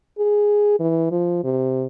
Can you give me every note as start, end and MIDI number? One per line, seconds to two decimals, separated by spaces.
0.19 0.77 68
0.80 1.10 52
1.12 1.40 53
1.44 1.86 48